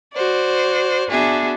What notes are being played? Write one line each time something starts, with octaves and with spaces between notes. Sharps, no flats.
F#4 C5 D5
B3 D4 F#4 G#4 E5